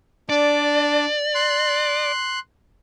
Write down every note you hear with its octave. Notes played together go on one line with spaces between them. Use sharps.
D4 D5
C6 F#6